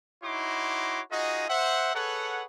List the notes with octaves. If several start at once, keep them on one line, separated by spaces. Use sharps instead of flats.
D#4 E4 F#4 C#5 C6 D6
D#4 F4 F#4 G#4 D#5
C5 E5 F#5
G#4 A4 B4 C#5 F#5